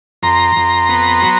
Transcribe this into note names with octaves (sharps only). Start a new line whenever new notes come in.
F2 A#5 C6
F2
B3
F#3